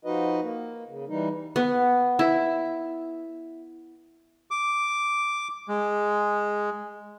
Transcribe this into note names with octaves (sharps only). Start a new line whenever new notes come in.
F3 D#4 F#4 B4 D#5
A#3
C#3
E3 G3 D#4
B3
E4
D6
G#3